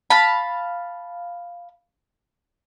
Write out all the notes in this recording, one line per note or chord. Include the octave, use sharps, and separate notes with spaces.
F5 A5 B5